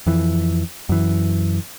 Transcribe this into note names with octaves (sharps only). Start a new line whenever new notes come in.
F2 E3
F#2 E3